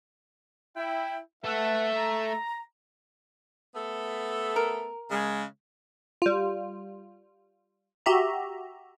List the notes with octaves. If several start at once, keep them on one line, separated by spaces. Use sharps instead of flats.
E4 G5
A3 A4 B4 E5 F#5 A5
A#5
A3 B3 A4
A#4
C#3 G#3
G3 F4
F#4 G4 E5 A#5